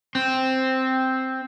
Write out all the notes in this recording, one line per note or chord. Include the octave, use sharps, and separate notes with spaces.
C4